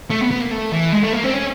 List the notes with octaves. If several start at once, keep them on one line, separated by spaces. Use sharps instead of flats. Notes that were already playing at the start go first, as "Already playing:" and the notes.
A3
B3
B3
A#3
A3
E3
G#3
A3
A#3
C4
C#4